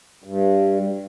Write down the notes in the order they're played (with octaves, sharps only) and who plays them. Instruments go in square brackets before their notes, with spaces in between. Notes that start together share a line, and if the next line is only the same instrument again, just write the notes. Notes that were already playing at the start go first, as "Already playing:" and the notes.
[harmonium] G2